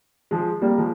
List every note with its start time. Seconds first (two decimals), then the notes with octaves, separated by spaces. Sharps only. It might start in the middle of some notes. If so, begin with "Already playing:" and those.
0.31 F3 G#3
0.62 G3 A#3
0.78 F3 G#3